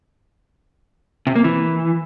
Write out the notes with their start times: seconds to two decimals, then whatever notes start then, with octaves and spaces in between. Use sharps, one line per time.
1.27 C3
1.36 A#3
1.44 E3